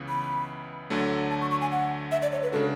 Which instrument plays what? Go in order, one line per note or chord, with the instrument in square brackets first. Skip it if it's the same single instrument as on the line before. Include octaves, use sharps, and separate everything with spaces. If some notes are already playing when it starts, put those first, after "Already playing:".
Already playing: [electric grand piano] C#2 C#3 E3 B3
[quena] B5
[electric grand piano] D2 D3 F#3 A3
[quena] A5
C#6
C#6
G#5
F#5
E5
D5
C#5
B4
[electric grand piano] C#3 G#3 D4 F#4 [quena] A4